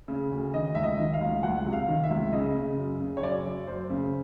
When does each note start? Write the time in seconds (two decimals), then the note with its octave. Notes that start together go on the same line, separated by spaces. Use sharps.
0.08 C#3
0.31 D2
0.54 D#3 D#5
0.75 C#2 E5
0.83 D#5
0.98 D#3
1.14 F5
1.21 C#2
1.43 C#2 F#5
1.66 C3
1.73 F5
1.88 D#3
2.03 E5
2.10 C#2
2.32 C#3 D#5
2.55 C#3
2.77 F#2
3.00 C#3
3.17 C#5
3.22 F#2 D5
3.45 F#2
3.67 F#2 C5
3.90 C#3